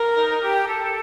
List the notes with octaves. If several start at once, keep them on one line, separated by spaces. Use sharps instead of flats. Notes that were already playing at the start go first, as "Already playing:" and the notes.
Already playing: A#4
D#4
G4
A4